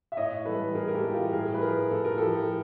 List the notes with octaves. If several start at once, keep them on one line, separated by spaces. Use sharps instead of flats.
E5
A2 C#5 D#5
E3 G3 A4 B4
A2 G#4 A#4
A#4
G4 A4
E3 G3
F4 G4
A2 G#4 A#4
B4
F3 G#4 A#4
A2 A4
A#4
F3 G4 A4